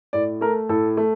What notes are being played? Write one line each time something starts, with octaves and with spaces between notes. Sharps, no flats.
A2 D5
A3 A#4
A2 A4
A3